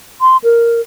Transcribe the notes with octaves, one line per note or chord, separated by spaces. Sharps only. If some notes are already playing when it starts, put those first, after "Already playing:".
C6
A#4